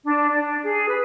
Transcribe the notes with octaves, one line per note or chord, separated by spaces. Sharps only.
D4
D4
G#4
B4